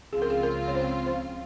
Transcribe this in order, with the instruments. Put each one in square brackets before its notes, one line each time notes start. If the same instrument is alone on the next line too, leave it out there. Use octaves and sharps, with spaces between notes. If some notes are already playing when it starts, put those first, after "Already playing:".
[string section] C#2 C#3 F3 C4 F4 [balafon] G#4
[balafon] A#4
G#4
A#4
C#5
C5
C5